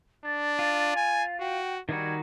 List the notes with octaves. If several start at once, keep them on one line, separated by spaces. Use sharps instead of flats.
D4 A6
F4
G#5
F#4 G5
D#3 G3 D#4 F#4 G#6